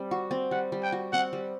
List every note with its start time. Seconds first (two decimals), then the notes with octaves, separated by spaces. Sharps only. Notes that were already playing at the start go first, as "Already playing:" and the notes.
Already playing: G3 C4
0.11 F#4
0.31 C4
0.51 G3 F#5
0.72 G3
0.83 G5
0.92 F#4
1.13 C4 F#5
1.33 G3